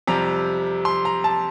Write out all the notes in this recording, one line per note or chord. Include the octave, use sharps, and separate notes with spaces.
F2 C3 G3 A#5
C6
A#5
A5